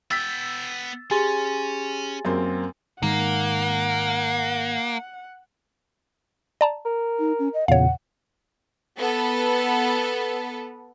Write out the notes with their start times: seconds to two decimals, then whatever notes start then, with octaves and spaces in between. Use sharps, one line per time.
0.11 B3 G5 E6 A6 B6
1.11 C#4 G4 G#4 G#5 C6 A6
2.25 F#2 A#3 C4
3.03 G#2 D#3 G#3 A#3 F#5
6.61 D5 A5 A#5
6.85 A#4
7.19 D#4
7.39 C#4
7.54 D#5
7.68 E2 A#2 C#3 C#5 F5 F#5
8.99 B3 A4